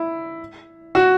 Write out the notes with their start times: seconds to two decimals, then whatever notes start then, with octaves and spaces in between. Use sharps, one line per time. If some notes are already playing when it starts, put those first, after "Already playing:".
Already playing: E4
0.95 F#4